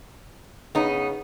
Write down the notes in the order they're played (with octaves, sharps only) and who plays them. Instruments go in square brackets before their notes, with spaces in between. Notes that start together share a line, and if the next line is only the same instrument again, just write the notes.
[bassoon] C#3 [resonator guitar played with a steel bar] B3 D#4